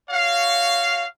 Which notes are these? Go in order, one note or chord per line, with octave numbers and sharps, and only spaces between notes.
F#4 C#5 F5